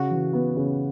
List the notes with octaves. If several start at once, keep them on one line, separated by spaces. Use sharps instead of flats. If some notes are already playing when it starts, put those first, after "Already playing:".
Already playing: C#3 F#4
E3
B3
C#3